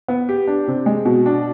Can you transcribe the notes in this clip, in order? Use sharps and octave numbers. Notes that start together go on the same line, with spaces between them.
B3
G4
D4
C3
G#3
B2
D4